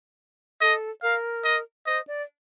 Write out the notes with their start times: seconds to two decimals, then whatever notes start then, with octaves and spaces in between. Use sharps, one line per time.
0.61 A4 D#5
1.02 A#4 F5
1.44 D#5
1.86 C5 D#5
2.07 D5